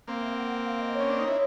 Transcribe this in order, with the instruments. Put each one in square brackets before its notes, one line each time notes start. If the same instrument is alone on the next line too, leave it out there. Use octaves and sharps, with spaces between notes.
[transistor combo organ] A#3 C4 [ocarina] F5
[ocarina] E5
F#5
F#5
F5
D#5
C#5
[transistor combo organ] C#4
D4
D#4
E4